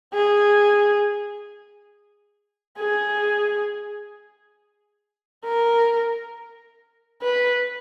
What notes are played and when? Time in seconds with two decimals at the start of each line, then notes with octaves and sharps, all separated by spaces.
0.14 G#4
2.79 G#4
5.44 A#4
7.22 B4